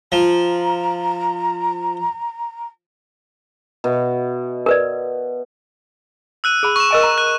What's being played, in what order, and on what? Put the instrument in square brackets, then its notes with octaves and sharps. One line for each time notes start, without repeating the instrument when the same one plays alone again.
[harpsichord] F3 [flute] A#5
[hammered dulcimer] B2 E5
[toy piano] A#4 B4 D5
[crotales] E6 F#6 D#7
[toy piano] G#4 B5
[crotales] C#6 E7
[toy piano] A#4 D#5 G#5
A#5
[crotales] F#6